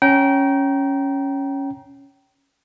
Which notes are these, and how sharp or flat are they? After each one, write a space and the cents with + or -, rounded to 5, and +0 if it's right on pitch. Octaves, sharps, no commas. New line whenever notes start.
C#4 +0 G5 -25 A#5 +20